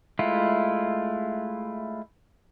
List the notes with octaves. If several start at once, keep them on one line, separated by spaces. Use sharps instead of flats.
G#3 A3 E4 F4